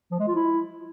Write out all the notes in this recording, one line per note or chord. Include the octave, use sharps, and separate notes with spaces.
F3
G#3
F4
E4